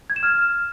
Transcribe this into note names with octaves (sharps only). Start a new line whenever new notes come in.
G#6
E7
F6